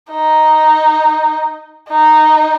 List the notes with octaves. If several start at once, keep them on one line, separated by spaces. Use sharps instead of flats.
D#4
D#4